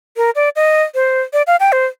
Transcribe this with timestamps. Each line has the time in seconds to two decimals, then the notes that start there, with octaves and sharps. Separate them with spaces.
0.17 A#4
0.35 D5
0.56 D#5
0.95 C5
1.33 D5
1.47 F5
1.60 G5
1.72 C5